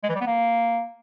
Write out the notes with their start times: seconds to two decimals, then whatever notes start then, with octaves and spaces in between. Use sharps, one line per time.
0.04 G#3
0.09 E3
0.15 G3
0.21 B3
0.27 A#3